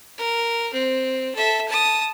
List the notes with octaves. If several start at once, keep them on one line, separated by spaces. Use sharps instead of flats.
A#4
C4
A4 E5
A5 D#6